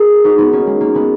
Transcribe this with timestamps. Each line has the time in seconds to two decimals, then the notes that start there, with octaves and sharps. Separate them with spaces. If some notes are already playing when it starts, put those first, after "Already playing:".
Already playing: G#4 A#4
0.24 D#4 F#4
0.38 B3 D#4
0.53 A#3 C#4
0.67 G#3
0.81 A#3
0.95 G#3 B3